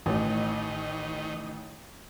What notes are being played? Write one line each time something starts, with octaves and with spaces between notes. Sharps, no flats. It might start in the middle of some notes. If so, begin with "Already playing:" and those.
A1 D#3